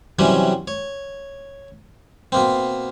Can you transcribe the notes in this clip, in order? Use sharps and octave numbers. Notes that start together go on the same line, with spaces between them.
C3 E3 F#3 G3 C#4
C#5
B2 A#3 C4